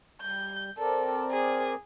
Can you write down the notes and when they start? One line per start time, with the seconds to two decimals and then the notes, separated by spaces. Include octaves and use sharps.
0.22 G3 G6
0.78 C4 A4 A#4 D5
1.31 G#4